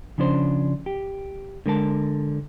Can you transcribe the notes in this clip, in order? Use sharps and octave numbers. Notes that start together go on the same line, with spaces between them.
C#3 F3 C#4 D4 C5
G4
D3 G#3 A#4 A5